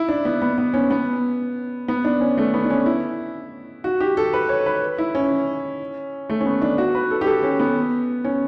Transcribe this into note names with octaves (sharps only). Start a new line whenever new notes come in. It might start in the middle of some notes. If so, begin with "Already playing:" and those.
Already playing: E4
D4
B3
B3
B3
C#4
B3
B3
D4
C#4
A3
B3
D4
C#4
E4
F#4
G4
A4
B4
C#5
B4
E4
C#4
A3
C#4
B3
D4
F#4
B4
A4
G4
A4
C#4
B3
C#4